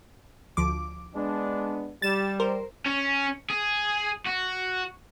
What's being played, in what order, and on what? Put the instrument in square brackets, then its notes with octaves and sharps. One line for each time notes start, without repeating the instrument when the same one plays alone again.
[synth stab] D2 F3 D6
[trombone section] G#3 B3 D4
[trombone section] G3 [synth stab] A6 E7
[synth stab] A#4 C5
[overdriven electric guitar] C#4
G#4
F#4